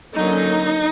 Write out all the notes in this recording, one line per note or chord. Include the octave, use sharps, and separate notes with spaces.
D3 F#3 A#3 C#4 D#4